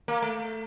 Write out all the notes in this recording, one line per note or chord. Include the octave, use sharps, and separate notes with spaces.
A#3
A3